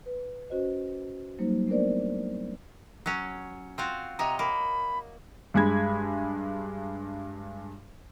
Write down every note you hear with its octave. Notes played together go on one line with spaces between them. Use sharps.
B4
C#4 F#4 C5 D#5
F#3 G3 A#3 D#4 C5
A3 B3 D4 A#4 C5 D5
F#3 C#4
C4 F4 F#4
C3 C#5 D#5 A#5
A#3 B5
G2 G#3 B5 G#6